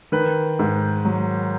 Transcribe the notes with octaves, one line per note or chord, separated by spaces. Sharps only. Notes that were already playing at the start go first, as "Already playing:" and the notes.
D#3 B4
G#2
F#3